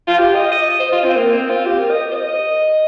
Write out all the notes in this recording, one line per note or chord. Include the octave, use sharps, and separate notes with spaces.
F4
G4
D#5
D#5
C5
F4
C4
A#3
C4
F4
G4
A#4
D#5
C5
D#5